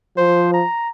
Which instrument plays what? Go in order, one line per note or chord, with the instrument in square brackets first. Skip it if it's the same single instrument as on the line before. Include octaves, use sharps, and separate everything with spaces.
[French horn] F3 [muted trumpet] C5
[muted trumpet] A#5